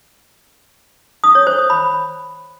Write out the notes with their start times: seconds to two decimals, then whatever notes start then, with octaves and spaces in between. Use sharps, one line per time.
1.24 D#6
1.35 C#5
1.47 C5
1.58 D#6
1.70 B5